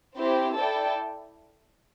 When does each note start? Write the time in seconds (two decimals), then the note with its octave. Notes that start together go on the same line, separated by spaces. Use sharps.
0.17 C4 E4 G4 C5
0.57 E4 A4 D5 G5